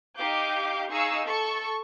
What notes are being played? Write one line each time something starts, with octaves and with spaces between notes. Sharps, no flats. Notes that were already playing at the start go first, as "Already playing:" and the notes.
D#4 G4 F5 D6 G6
D#4 G#4 F5 C#6 E6
A4 C#6